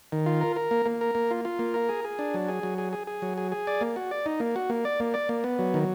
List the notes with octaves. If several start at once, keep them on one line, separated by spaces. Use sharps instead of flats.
D#3
F4
A#4
A#4
A#3
A#3
A#4
A#3
F4
F4
A#3
A#4
G#4
G#4
D4
F#3
G#4
F#3
G#4
G#4
G#4
F#3
G#4
G#4
D5
A#3
F#4
D5
D#4
A#3
F#4
A#3
D5
A#3
D5
A#3
B3
F#3
D#3